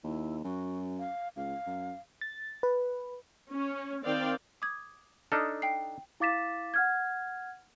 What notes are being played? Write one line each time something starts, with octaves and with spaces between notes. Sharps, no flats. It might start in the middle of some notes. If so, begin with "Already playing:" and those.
D#2 E4
F#2 F#4
F5
C#2 F5
F#2
A6
B4
C#4
D#3 C4 D5 F5 G5
D6 D#6 G#6
D4 D#4 A4 D#6 F6
G5 C7
E4 F5 D6 A6 B6 E7
F#5 F6 G#6